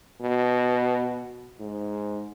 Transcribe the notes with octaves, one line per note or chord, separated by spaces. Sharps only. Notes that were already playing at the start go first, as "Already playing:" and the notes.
B2
G#2